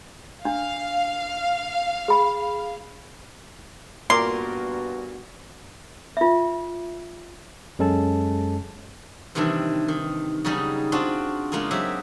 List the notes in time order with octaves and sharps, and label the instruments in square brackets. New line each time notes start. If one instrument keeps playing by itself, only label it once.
[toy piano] D4 [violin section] F5
[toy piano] G#4 B5
[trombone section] G2 B3 F#4 [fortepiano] A#2 A#4 D6 [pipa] C6
[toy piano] F4 E5
[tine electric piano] F#2 G#3 C#4 A4 A5
[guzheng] C3 D#3 E3 G3 D4
D#3
C#3 F#3 G3 D#4 G#4
C4 D4 F4 F#4
C#3 G#3 A#3 F4 G#4
F#3 C4 G4 G#4 E5